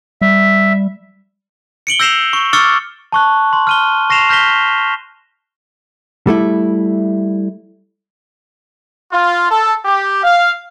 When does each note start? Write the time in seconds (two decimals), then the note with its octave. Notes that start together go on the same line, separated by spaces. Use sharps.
0.22 G3 E5
1.87 C#7 D7 F#7 G7
2.00 E6 G6 A#6 C7 E7 F7
2.33 C#6
2.53 C#6 D6 E6 F6 A6 C#7
3.12 A5 C#6 F#6
3.53 C6
3.67 F6 D#7 G7
4.10 C#6 A#6 C7 E7 F7
4.29 F6 G6 A#6 B6 G7
6.27 G3 A3 E4
9.12 F4
9.51 A4
9.85 G4
10.23 F5